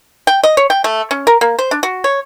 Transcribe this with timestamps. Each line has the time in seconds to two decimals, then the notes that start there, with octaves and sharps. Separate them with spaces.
0.27 G5
0.43 D#5
0.57 C#5
0.70 G5
0.84 A3
1.11 C#4
1.27 A#4
1.41 A#3
1.59 C5
1.71 D4
1.83 F#4
2.04 C#5